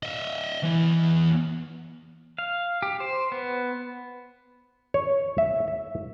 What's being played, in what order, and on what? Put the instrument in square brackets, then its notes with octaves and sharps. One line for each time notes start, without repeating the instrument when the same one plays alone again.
[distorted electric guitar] D#5 E5
E3 B3
[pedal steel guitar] F5
G4
C5
B3
[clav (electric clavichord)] C#5
E5
E5